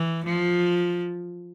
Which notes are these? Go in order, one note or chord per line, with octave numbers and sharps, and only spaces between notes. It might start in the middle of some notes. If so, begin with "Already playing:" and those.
Already playing: E3
F3